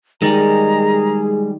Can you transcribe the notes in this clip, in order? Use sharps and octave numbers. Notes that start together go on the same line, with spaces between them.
D#3 G3 G#3 G#4 D5 A#5